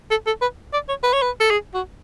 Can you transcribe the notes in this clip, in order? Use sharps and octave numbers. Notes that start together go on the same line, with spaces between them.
A4
A4
B4
D5
C#5
B4
C#5
B4
A4
G#4
F#4